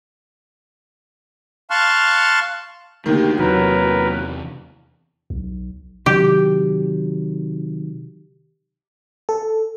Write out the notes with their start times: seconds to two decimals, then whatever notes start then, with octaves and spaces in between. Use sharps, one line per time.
1.70 F5 A5 C6 C#6 F6 F#6
3.06 D#2 D3 D#3 A3 G4
3.39 E2 C3 E3 F#3 A#4 B4
5.30 B1
6.06 C3 D#3 F#3 G4
9.29 A4